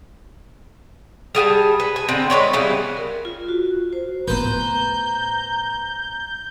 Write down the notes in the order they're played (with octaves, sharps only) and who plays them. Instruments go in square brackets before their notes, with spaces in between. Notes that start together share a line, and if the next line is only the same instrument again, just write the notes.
[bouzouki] G3 G#4 F#5 A5
B4
G#5
D3 C4
G#3 B4 C#5 D5
C#3 E3 G3 B3
[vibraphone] A#4
F4
F#4
C5
[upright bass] A2 B3 [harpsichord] B4 C5 [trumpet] A#5 [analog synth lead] G6